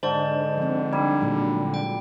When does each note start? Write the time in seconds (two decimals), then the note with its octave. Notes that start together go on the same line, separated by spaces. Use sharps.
0.03 G#2 D3 C5 D5 A5
0.58 F3 C4
0.93 G3 D4 D#4
1.20 A#2 F#3 G#3
1.74 G5